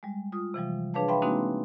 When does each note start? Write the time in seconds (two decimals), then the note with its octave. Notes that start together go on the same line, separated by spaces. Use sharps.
0.03 G3 G#3
0.32 F4 D#6
0.54 C3 E3 F3 G3
0.94 D4 G#4 B4 C#5 F5 A5
1.08 B4 E5 F5 G5 B5 C6
1.22 G#3 A#3 C4 D4 D#4 F#4